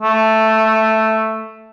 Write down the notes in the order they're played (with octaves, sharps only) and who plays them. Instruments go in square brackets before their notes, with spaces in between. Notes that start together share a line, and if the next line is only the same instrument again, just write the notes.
[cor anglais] A3